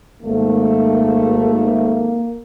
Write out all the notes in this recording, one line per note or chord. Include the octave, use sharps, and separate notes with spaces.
G#1 A3 A#3